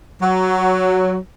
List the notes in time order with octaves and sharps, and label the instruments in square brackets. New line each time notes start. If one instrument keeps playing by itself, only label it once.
[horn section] F#3